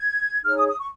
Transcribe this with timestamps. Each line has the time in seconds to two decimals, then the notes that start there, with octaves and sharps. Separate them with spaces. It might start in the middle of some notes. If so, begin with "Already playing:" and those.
Already playing: G#6
0.45 D#4 G#4 C#5 F6
0.57 D#6
0.68 D#6
0.79 C#6